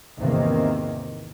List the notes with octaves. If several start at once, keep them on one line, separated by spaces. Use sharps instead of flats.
G#1 E2 C3 D#3 A#3 C4